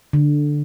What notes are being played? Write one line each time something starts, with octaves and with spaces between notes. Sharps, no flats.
D3